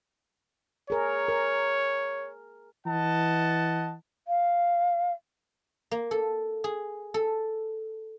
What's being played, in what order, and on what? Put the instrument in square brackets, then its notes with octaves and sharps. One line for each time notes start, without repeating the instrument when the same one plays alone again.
[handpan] G#4 A#4 [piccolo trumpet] C#5
[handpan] A#4
[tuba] E3 [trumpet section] D#5 F#5 A5
[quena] F5
[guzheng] A#3
A4
G#4
A4